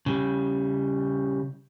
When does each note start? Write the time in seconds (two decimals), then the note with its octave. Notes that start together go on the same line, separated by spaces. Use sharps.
0.06 C#3 G3